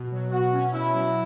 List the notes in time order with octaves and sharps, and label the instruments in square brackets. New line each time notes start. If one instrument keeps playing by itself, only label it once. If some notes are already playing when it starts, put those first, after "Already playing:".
Already playing: [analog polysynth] B2
F#3
[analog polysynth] B2 [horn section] F#4
[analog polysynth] C#4
[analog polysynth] B2 [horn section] E4
[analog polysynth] F#3